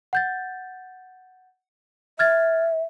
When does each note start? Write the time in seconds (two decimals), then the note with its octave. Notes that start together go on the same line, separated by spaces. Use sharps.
0.13 F#5 G6 A6
2.19 E5 F6 G#6 A6